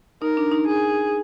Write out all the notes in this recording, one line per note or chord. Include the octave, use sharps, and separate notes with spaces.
D#4 A#4
D4
D#4
G#4